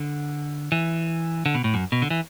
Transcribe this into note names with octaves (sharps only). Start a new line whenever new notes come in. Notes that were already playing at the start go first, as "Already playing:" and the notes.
Already playing: D3
E3
D3
B2
A2
F#2
B2
D3
E3